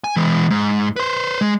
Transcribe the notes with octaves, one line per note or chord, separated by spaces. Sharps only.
G#5
E3 G#3
G#2
B4 C5
G#3